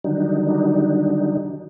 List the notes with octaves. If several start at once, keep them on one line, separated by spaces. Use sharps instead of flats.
D3 D#3 F#3 G3 D4 D#4